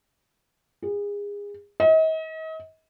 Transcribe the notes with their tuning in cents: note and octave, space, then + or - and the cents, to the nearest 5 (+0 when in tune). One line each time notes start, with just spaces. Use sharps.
G#4 -30
D#5 +40